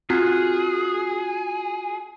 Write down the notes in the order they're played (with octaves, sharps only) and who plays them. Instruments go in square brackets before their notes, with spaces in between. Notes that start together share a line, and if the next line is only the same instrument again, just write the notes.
[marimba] C4 [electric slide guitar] F4 F#4 [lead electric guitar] G#4